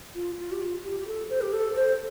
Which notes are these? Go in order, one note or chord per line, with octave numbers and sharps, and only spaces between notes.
F4
F4
G4
F4
G4
G4
A4
C5
G4
A4
C5